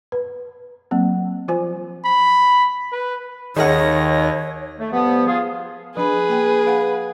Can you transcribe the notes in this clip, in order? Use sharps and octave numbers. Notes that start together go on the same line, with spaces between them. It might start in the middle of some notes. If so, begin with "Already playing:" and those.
B4
F#3 A#3 C4
F3 F4 C5 G#5
B5
B4
D#2 D#3 G#4 C#5 D#5 F#5 A#6
A3
G2 F3 B3
F4 G#4
F3 D4 G#4 B4 B5
A#3 G5
F5 F#5 B5